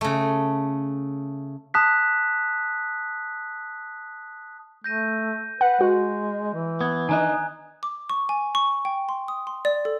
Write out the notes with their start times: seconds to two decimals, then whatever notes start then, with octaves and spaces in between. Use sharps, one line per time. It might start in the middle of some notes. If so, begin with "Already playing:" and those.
0.01 C#3 A3
1.74 A5 D#6 F#6 B6
4.84 A3 G6 A#6 D#7
5.61 B4 F#5
5.81 G#3 F#4
6.54 E3
6.81 B3 D#6 G#6
7.09 D#3 D4 D#5 G#5 A#5 F#6
7.83 D6
8.10 C#6
8.29 G#5
8.55 C#6
8.85 G5
9.09 C6
9.28 D#6
9.47 C6
9.65 D5
9.85 A4